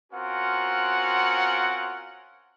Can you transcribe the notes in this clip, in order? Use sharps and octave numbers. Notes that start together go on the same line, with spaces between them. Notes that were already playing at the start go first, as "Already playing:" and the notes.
C4 C#4 F4 F#4 A#4 F#5